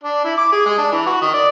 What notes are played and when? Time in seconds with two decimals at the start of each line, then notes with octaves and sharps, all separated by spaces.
0.03 D4
0.24 E4
0.37 D6
0.52 G#4
0.66 G#3
0.78 D4
0.92 E3
1.06 F#4
1.22 D#3
1.34 D5